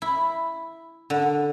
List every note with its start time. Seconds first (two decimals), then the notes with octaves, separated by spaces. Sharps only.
0.02 E4
1.10 D3